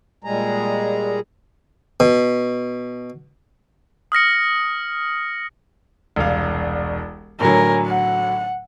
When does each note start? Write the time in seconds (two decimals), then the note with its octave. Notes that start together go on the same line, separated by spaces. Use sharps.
0.24 A#2 G3 G#3 G#4 A#5
2.00 B2
4.12 D#6 F6 A#6 C#7
6.16 E1 C2 F5
7.40 A2 D3 F#3 A#4 G#5
7.87 F#5